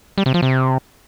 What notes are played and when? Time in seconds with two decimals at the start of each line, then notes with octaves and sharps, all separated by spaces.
0.18 G3
0.26 C3
0.34 F3
0.42 C3